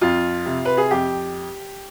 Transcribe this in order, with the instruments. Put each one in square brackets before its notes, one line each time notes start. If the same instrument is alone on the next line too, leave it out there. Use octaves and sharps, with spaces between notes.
[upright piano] F2 F4
C3
B4
G#4
F2 G4